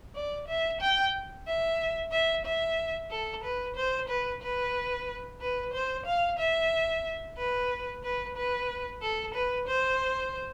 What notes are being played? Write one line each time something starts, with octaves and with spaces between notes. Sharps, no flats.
D5
E5
G5
E5
E5
E5
A4
B4
C5
B4
B4
B4
C5
F5
E5
B4
B4
B4
A4
B4
C5